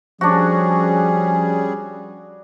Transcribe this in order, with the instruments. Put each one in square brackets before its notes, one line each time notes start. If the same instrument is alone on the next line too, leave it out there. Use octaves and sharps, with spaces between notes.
[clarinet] F3 [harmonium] G3 C#4 G#4 [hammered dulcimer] D4 F#4